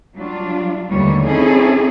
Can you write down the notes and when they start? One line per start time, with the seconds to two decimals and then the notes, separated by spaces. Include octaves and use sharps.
0.15 F#3 G3 D4 F4
0.89 D#2 D3 E3 G3 A3 C#5
1.26 C4 C#4 D#4 E4 G#4 A4